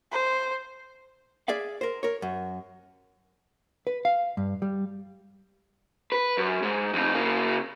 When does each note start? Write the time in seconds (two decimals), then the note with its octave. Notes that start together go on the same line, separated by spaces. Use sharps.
0.12 C5
1.48 G#4 D5 E5 F5
1.81 A#4 C5
2.03 A#4 C#5
2.22 F#2
3.87 B4
4.05 F5
4.37 G2
4.62 G3
6.12 B4
6.37 F#2
6.62 G#2
6.93 F2 D#4
7.14 C#3 A#3